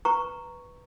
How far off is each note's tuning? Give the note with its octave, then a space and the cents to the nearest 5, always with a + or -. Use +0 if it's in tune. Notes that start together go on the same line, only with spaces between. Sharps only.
B4 +0 A#5 -10 C#6 +0